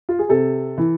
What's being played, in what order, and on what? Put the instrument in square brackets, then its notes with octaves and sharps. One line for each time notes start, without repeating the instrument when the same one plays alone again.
[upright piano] F4
G#4
C3 A4
E3